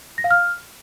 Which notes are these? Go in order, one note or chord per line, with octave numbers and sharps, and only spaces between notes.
A#6
F5
F6